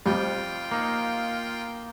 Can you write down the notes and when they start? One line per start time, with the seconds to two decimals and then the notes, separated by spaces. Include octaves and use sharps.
0.06 F2 G3 F4 G5
0.71 A#3 D#4